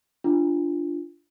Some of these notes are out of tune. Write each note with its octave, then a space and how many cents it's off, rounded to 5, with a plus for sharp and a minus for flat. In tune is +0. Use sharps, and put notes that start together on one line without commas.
D4 +0 F4 -15